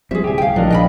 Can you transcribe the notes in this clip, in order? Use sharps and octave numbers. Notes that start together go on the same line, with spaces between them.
F3 G3 C4 G#4 E5
D1 C2 G4 G#5
F5 G5
A#1 A2 D3 F#3 D4 D#4 A#4 B4
A#3 D#5 G5 B5